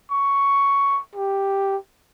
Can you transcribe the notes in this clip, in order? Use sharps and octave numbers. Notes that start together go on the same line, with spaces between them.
C#6
G4